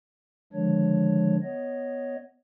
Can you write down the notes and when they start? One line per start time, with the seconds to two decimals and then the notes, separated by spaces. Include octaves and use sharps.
0.53 D3 D#3 F3 G#3 D4 C#5
1.43 B3 C#5 D#5